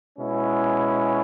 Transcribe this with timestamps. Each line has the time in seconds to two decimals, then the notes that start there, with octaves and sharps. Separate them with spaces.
0.18 B2 G#3 C#4 E4